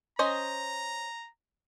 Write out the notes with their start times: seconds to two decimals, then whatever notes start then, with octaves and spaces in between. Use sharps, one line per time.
0.19 C#4 C5 D#5 A#5